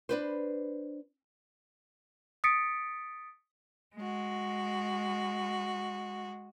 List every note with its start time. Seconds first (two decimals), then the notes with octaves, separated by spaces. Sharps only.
0.09 D4 B4 C5
2.44 D#6 A6 B6 C#7 D7
3.96 G#3 F#4